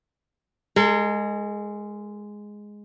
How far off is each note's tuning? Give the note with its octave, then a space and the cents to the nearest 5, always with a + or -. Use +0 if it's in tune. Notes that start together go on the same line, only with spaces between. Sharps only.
G#3 +0 A#4 -45